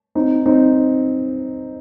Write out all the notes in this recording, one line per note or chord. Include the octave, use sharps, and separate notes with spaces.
C4 D#4
C4 D#4